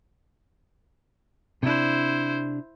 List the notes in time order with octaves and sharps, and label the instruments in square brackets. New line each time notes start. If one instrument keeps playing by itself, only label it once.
[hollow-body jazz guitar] C3 D4 [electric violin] E4 C5